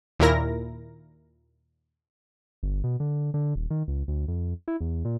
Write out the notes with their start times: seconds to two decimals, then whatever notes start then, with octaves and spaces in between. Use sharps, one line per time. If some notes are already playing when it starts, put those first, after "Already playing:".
0.19 D#2 A#2 E4 A#4 A#6
2.63 G1
2.84 B2
3.00 D3
3.34 D3
3.56 D#1
3.71 D#3
3.88 C#2
4.08 D2
4.28 F2
4.68 E4
4.81 E2
5.05 A#2